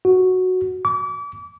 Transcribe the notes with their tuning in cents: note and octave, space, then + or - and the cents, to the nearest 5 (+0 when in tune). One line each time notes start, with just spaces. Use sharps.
F#4 -5
D6 -35